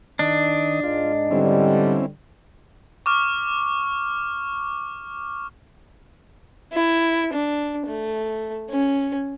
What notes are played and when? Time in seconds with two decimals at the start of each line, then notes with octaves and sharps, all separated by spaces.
0.19 D#3 D4 D#5
0.83 G#2 F4 D#5
1.31 D3 G3 C4 C#4 E4
3.06 C#6 D6 F6
6.73 E4
7.33 D4
7.86 A3
8.70 C#4